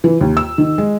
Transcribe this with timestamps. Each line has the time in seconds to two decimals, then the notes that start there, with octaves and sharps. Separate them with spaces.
0.04 E3
0.21 D#2
0.37 E6
0.58 D#3
0.78 G#3